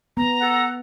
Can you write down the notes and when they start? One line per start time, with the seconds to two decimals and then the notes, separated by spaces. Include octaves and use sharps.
0.17 B3 A#5
0.41 A4 F#5